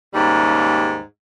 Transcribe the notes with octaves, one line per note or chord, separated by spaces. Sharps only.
D#2 G#2 C#3 G3